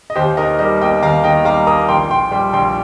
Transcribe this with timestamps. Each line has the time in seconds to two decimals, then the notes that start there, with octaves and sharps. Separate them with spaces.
0.10 D#5
0.16 D#2 G4 C5
0.37 D#3 A#4 D#5
0.59 G3 A#4 D#5
0.81 A#3 D#5 G5
1.03 D#2 F5 A#5
1.24 D#3 D#5 G5
1.45 G3 F5 A#5
1.67 A#3 A#5 D#6
1.89 A#1 G5 C6
2.10 A#2 G5 C6
2.31 G3 G5 C6
2.53 A#1 G5 C6